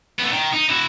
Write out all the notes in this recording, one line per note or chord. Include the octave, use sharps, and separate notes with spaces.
A3 B3
D#3
D#4
E4 F#4